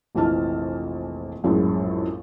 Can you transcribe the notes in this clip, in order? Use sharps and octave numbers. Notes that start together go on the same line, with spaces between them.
F1 A#1 E3 F4 A5 F6
A#1 F#2 A2 G#3